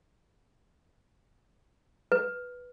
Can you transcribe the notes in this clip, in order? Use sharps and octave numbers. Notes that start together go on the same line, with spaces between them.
B4